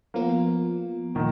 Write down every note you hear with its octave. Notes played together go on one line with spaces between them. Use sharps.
F3 A#3 B3 F4
A#2 D#3 F3 A#3